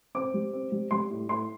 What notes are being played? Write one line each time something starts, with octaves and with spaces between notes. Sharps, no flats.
C4 D6
G3
C4
G3
G3 C6
A2
A2 C6